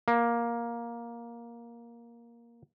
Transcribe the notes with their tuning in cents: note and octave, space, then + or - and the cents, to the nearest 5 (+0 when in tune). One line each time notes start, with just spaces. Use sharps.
A#3 +10